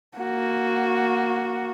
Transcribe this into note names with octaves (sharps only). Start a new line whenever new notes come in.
A#3 F#4